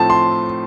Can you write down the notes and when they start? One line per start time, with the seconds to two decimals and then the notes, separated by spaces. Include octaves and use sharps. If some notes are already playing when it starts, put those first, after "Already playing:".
Already playing: A2 F3 A3 C4 A5
0.10 C6